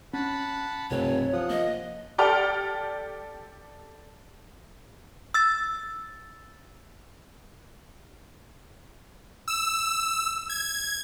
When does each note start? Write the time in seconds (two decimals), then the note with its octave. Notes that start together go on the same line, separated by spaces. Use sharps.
0.13 C#4 F#5 A5 B5
0.90 F1 B1 G2 C3 C#5
1.33 F3 F#5 D#6
1.50 A#3 D#5
2.18 G4 A4 D5 G5 F6 F7
5.34 E6 A6
9.48 E6
10.49 G#6